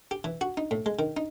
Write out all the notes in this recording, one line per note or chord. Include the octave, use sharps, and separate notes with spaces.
G4
E3
F#4
D#4
A2
G#3
D#3
D#4